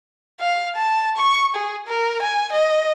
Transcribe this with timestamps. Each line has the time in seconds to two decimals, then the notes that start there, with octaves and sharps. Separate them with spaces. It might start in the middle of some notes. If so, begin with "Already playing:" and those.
0.40 F5
0.76 A5
1.17 C#6
1.55 G#4
1.87 A#4
2.22 G#5
2.52 D#5